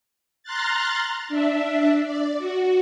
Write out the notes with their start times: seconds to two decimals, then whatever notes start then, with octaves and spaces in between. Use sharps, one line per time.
0.43 A#5 C6 F6 F#6 A6
1.28 D4 E5
2.04 D5
2.38 F#4